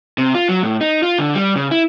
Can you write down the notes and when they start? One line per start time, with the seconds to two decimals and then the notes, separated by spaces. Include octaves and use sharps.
0.18 C3
0.35 F4
0.49 F#3
0.63 A2
0.81 D#4
1.03 F4
1.19 D3
1.35 G3
1.56 C#3
1.71 E4